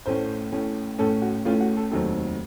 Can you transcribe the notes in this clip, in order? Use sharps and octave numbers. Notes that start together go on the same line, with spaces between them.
A1 A2 A3 C#4 C5
A1 A2 A3 C#4
A1 A2 A3 C#4 A4
F#4
A1 A2 A3 C#4 F4
F#4
A4
F1 D#2 D#3 F#3 C4 A4